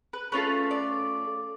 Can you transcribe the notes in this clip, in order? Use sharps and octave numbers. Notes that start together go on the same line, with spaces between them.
B4
A3 C#4 F4 A4 B4
D5